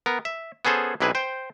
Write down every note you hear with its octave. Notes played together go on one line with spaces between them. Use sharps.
B3 A#4
E5
B3 C#4 G#4 A4 C5
B1 C3 E4 G#4 B4
C5 G5